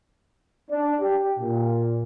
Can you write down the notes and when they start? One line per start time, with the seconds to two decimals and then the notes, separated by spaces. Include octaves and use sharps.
0.70 D4
1.01 G4
1.39 A#2